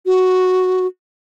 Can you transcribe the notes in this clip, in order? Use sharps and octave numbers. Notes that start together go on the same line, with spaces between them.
F#4